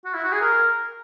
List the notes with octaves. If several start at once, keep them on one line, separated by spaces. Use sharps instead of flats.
F#4
E4
F#4
G#4
A#4